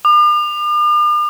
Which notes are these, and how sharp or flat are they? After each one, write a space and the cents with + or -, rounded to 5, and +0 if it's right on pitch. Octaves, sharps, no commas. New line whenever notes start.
D6 +45